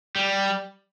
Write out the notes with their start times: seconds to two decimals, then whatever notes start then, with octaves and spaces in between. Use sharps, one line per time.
0.16 G3